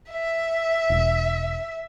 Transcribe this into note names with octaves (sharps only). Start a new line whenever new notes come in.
E5
E1